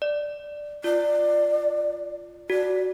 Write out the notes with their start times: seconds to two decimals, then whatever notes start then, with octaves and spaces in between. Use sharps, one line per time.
0.02 D5
0.84 F4 D5
2.50 F#4 D5